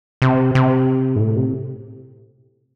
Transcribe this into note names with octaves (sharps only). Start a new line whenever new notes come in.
C3
C3
G#2
A2
C3